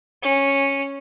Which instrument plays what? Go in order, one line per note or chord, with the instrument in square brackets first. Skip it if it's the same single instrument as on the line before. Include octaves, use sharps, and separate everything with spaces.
[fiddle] C#4